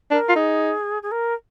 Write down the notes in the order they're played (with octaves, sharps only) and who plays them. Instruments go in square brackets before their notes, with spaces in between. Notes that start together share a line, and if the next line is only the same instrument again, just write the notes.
[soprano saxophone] D4 [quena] A#4
[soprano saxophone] F4
[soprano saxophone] D#4 [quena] G#4
[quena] G#4
A#4